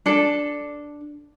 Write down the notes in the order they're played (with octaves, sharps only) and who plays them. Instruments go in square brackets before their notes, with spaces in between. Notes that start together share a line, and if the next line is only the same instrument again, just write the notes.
[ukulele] D4 A4